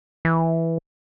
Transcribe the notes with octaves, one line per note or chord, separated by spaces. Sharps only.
E3